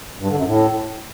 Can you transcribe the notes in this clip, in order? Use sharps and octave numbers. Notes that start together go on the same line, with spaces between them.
G2
D3
F#2
A2